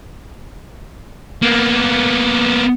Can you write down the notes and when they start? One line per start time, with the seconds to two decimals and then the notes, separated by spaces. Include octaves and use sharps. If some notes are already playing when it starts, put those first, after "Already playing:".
1.42 A#3 B3